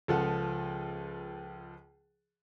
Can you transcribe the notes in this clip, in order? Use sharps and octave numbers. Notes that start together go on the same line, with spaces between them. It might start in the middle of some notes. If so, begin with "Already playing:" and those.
C#2 F3 A4 F#5